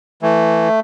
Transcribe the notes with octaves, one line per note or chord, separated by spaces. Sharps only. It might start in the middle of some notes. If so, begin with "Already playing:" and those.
E3 A3